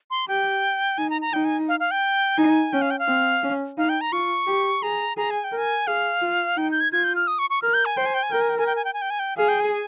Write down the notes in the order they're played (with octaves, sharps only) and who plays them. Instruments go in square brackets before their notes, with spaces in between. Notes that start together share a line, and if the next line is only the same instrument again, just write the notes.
[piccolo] C6
[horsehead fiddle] G4 [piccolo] G5
[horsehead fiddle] D#4 [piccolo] G#5
[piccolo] A#5
A#5
[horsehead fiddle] D#4 [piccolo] G5
[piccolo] G#5
F5
F5
G5
[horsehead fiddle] D#4 [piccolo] G#5
[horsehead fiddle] C#4 [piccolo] G5
[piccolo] F5
G5
F5
[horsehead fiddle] C4
C#4
[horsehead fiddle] D#4 [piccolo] F5
[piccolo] G5
A#5
[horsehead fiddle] F4 [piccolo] C#6
[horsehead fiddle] G4
[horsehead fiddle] G#4 [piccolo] A#5
[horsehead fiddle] G#4 [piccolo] A#5
[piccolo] G#5
G5
[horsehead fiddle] A#4
[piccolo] G#5
[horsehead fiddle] G#4 [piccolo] F5
[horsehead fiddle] F4
[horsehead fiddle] D#4 [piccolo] G5
[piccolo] G6
G#6
[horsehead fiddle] F4 [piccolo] G#6
[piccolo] G6
F6
D#6
C#6
C#6
[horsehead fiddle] A#4 [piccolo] F6
[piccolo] G6
G#5
[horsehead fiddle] C5 [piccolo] G5
[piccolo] G#5
G5
G#5
[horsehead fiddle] A#4 [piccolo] G5
[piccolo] G#5
G5
G#5
G5
G#5
G5
G#5
G5
G#5
G5
[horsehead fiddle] G#4 [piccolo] F5
[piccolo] G5
G#5